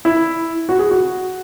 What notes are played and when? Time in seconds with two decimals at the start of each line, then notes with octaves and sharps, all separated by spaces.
0.05 E4
0.69 F#4
0.79 G#4
0.91 F#4